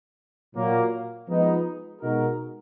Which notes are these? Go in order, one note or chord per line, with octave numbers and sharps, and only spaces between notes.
A#2 F#3 A#3
F3 G#3 B3 D#4
B2 G#3 D#4 F#4 A#4